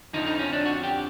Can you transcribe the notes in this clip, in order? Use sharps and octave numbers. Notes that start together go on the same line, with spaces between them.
F2 D3 F3 D#4
D#4
C#4
D4
F#4
G4